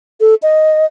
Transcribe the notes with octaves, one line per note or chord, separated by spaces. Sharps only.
A4
D#5